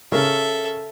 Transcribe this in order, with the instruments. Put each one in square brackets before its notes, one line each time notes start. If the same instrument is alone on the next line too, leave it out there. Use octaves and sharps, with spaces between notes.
[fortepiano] C#3 A#4 [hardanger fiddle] A4 E5